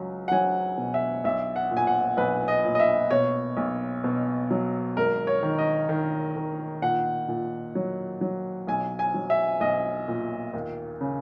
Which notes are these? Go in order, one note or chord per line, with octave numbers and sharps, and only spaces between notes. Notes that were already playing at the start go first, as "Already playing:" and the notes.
Already playing: C#2 F#3
F#5
F#3 G#5
B2
E5
B1 E5
F#5
A#2
G#5
F#5
B1 B4
D#5
A#2
D#5
E5
B2 C#5
B1
B2
F#3
G#1 A#4
C#5
D#3
D#5
D#3
D#3
A#2 F#5
A#2
F#3
F#3
B1 G#5
G#5
F#3
E5
B1 D#5
A#2
D#2
C#3